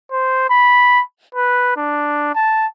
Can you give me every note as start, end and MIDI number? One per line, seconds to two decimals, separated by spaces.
0.12 0.45 72
0.50 1.02 83
1.35 1.72 71
1.77 2.32 62
2.35 2.67 81